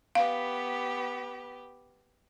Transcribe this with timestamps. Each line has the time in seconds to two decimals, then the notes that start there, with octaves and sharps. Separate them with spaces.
0.15 B3 G4 B4 F5